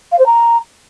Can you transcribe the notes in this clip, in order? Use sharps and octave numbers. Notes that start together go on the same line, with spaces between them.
F5
C5
A#5